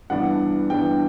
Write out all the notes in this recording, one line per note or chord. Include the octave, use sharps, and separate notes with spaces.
G2 E3 B3 D4 F#5
G2 E3 B3 D4 G5